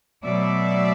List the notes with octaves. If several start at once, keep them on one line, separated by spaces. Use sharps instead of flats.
B2 F#3 A3 D5 E5